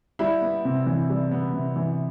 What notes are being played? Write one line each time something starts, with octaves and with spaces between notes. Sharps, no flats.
G3 E4
B3
C3
E3
G3
B3
C3
E3